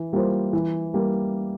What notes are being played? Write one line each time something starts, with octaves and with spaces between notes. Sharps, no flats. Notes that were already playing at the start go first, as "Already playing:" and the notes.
Already playing: E3
G3 A#3 F4 C5
E3
G3 A#3